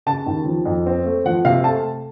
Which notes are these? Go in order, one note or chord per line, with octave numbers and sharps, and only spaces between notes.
C#3 A5
D#2
F3
F2
C4
A3
F3 F#5
C3 F5
A3 A5